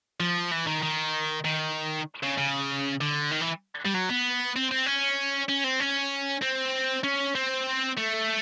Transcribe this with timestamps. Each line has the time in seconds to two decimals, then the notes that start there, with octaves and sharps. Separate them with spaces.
0.20 F3
0.51 E3
0.67 D#3
0.82 D#3
1.45 D#3
2.23 C#3
2.38 C#3
3.01 D3
3.31 D#3
3.41 E3
3.85 G3
3.94 F#3
4.09 B3
4.56 C4
4.71 C4
4.86 C#4
5.49 C#4
5.64 C4
5.80 C#4
6.41 C4
7.04 C#4
7.35 C4
7.98 A3